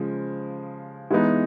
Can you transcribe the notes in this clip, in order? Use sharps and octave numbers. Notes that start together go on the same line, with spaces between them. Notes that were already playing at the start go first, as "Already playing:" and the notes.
Already playing: C#3 F3 G#3
E3 G#3 B3 D#4